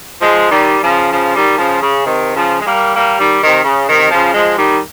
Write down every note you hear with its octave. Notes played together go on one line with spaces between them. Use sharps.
F3 G#3
D#3 G3
C#3 F3
C#3 F3
D#3 G3
C#3 F3
C#3
C3 D#3
C#3 F3
G#3
G3 A#3
G3 A#3
D#3 G3
C3 D#3
C#3
C3 D#3
C#3 F3
F3 G#3
D#3 G3